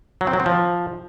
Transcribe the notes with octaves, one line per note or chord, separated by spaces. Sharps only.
F#3
C4
F#3
C4
F3